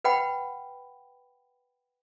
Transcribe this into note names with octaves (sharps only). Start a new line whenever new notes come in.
B4 F#5 G5 B5